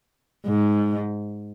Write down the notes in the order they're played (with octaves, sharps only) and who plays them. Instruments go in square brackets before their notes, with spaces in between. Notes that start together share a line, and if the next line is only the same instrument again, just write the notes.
[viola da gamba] G#2